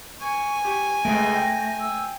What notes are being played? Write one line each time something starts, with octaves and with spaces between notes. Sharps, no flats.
G#5 C#6
G4 C#6
C#2 G#3 A3 A#6 D7
G5
E6